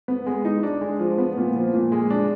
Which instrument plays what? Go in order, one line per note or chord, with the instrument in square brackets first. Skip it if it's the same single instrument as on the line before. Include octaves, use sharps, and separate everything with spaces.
[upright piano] B3
G#3
D#4
D4
G#3
F3
B3
A#2
F3
A#2
G#3
D4